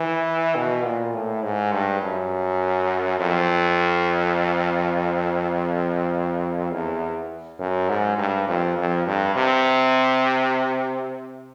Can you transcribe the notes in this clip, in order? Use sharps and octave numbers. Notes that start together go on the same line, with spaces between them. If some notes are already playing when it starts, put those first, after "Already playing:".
Already playing: E3
B2
A#2
A2
G#2
G2
F#2
F2
E2
F#2
G#2
G2
F2
F2
G2
C3